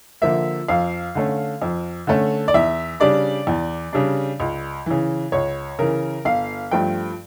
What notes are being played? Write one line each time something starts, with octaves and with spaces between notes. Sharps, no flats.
D3 F3 A#3 E5
F2 F5
D3 A3 C#4
F2
D3 A3 C#4
D5
E2 E5
C#3 G3 D4 D5
E2
C#3 G3 D4
C#2
C#3 E3
C#2 C#5
C#3 E3 A#4
G1 F5
G2 F3 A3 G5